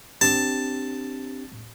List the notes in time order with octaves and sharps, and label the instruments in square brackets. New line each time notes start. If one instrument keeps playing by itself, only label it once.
[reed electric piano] C4 D4 G4 [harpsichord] A5